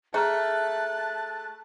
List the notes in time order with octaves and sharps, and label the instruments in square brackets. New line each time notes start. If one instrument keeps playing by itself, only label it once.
[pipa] A3 [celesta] G#4 A#5 F6 [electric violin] A5 [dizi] F#6